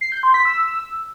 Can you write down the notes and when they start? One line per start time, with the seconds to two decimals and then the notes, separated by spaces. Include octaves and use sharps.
0.01 C7
0.12 G6
0.23 C6
0.34 B6
0.45 E6